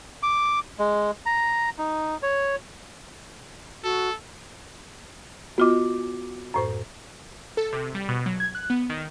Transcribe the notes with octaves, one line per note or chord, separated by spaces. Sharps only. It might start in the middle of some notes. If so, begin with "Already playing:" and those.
D6
G#3
A#5
D#4
C#5
F#4 A4
B3 F4 F#4 D#5 D6
F#2 A2 C5
A4
C3
G3
B2
F#3
G#6
F#6
B3
D#3